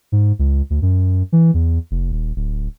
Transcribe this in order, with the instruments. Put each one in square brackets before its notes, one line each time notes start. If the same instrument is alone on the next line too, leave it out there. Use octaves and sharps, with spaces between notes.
[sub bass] G#2
C#2
D2
F#2
E3
E2
F1
D#1
D1